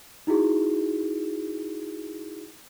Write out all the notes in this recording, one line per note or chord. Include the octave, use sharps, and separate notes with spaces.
D#4 E4 F#4 G#4